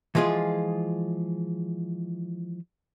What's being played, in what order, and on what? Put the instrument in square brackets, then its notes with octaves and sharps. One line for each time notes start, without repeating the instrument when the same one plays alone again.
[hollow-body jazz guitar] E3 F3 G#3 F4 G#4